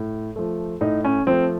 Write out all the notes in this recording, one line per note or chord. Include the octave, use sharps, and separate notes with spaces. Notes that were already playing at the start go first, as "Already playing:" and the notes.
Already playing: A2
F3 A3
A2 D#4
C#4
F3 A3 C4